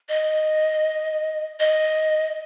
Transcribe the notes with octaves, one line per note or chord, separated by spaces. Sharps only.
D#5
D#5